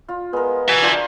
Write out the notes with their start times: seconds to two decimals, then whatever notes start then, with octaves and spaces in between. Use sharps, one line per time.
0.09 F4
0.33 G#3 B3 A#4
0.68 F#4 E5 G#5
0.82 D4 F4 C5